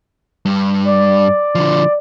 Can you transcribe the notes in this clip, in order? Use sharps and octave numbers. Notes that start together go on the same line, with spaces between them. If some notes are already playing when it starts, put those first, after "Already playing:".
G2
D5
D3 F3